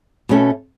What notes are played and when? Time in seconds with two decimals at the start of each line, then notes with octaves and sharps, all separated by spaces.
0.29 B2 A3 C#4 A4